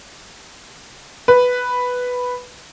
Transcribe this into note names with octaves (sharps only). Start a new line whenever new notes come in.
B4